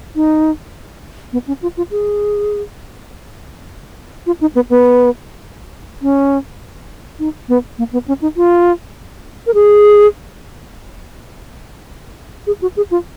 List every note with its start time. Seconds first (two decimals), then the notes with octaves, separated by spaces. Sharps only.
0.16 D#4
1.33 B3
1.48 C#4
1.62 F4
1.77 F4
1.91 G#4
4.26 F4
4.41 D#4
4.55 B3
4.70 B3
6.02 C#4
7.19 D#4
7.49 B3
7.78 A#3
7.93 B3
8.08 C#4
8.22 D#4
8.37 F4
9.47 A#4
9.54 G#4
12.47 G#4
12.62 F#4
12.77 G#4
12.91 F4